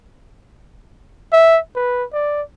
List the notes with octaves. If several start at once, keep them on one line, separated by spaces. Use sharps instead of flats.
E5
B4
D5